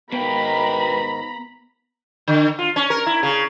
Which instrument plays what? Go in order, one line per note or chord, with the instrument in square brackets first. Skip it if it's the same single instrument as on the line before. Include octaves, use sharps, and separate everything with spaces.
[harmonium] G#2 D#3 [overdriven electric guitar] B2 G5 [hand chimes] B3 [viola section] A#5 B5
[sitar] D3
F4
C#4
A#4
E4
C#3